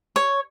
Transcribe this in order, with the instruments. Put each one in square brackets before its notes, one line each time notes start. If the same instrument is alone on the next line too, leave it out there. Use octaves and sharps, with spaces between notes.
[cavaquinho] C#5